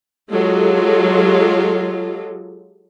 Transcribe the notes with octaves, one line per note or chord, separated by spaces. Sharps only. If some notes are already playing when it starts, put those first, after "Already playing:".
F#3 G#3 F4 G4 A4